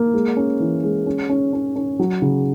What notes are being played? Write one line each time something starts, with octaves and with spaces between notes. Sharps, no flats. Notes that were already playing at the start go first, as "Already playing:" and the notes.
Already playing: A#3
G#3
C#4
E3
G#3
C#4
C#4
C#4
C#4
F#3
C#3